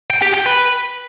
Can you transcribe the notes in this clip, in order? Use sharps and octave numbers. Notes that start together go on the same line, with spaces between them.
G5
G4
G5
B4